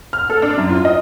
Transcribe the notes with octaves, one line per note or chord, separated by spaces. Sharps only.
F6
A4
D4
F#2
F4
D#5